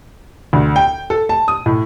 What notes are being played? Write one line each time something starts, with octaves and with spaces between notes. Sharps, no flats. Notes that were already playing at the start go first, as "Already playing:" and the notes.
D2
G5
A4
A5
D#6
A2